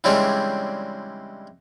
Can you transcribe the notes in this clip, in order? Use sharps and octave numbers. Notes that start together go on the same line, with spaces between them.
C#3 E3 G3 G#3 C4 D4